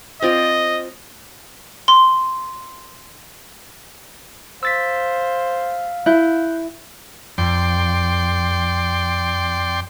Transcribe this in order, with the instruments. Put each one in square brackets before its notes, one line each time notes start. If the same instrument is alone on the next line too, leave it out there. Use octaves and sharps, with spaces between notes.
[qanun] C4 F4 D5 [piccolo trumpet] D#5
[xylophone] C6
[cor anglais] C5 [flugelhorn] F5 [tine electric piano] E6 A6 B6
[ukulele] E4 [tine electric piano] F#6 G6
[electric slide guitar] F2 [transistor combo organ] D5 G5 C6